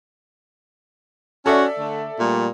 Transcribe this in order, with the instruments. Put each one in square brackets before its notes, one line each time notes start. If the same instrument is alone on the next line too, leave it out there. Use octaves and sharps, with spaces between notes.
[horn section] C#4 F#4 [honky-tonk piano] A4 D5 E5
[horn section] D3 A3
A#2 G3 A3